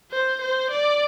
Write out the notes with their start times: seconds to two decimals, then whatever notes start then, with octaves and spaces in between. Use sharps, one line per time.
0.12 C5
0.41 C5
0.70 D5